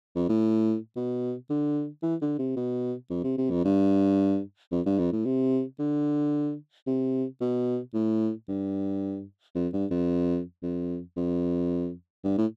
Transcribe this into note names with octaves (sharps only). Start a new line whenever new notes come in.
F2
A2
B2
D3
E3
D3
C3
B2
F2
C3
C3
F2
G2
F2
G2
F2
A2
C3
D3
C3
B2
A2
G2
F2
G2
F2
F2
F2
G2
A2